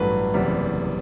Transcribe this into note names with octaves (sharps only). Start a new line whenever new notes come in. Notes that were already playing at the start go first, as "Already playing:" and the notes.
Already playing: A1 G2 F#3 A3 B4
F#1 E2 C3 G3